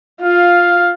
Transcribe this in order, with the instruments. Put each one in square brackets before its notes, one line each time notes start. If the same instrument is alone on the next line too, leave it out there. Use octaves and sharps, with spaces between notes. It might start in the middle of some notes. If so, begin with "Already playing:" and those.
[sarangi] F4 [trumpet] F5